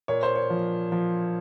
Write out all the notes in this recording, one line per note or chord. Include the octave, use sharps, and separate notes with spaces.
A#2 C#5
C5
C#5
F3
F3